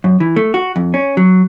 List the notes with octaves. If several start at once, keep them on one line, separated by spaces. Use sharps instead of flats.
F#2
E3
A3
F#4
F2
C#4
F#3